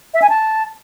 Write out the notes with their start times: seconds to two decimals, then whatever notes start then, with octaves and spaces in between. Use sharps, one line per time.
0.14 E5
0.22 G#5
0.30 A5